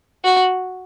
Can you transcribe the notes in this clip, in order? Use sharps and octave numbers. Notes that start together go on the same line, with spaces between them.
F#4